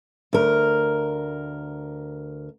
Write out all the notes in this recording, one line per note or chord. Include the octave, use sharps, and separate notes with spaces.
D2 A#4